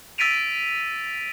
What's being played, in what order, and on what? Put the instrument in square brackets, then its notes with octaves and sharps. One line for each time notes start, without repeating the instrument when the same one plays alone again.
[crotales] E6 A6 B6 D7 D#7 F7